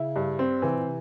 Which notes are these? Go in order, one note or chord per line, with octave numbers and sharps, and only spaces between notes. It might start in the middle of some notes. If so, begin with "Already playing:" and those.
Already playing: C#3 E4
G2
C4
C#3 E3
C3
A#2
C3